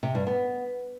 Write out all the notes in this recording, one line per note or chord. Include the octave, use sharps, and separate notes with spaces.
C3
G2
B3